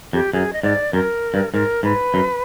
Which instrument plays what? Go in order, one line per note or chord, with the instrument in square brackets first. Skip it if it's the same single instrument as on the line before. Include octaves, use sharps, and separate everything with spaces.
[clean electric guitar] F2 [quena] G4
[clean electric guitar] F#2 [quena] G#4
[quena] D#5
[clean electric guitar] G#2 [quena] D5
[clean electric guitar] F#2 [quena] A#4
[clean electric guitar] G2
[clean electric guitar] G#2 [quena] A#4
[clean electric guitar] G#2 [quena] B4
[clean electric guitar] F#2